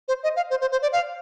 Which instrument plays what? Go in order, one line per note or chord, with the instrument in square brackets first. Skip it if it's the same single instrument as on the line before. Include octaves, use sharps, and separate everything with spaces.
[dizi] C5
D#5
F5
C5
C5
C5
D5
F5